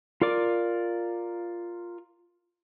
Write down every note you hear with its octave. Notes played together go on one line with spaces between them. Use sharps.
F4 A#4 D5 D6